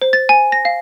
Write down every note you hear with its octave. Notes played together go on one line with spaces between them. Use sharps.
C5
A6
G#5
A#6
F5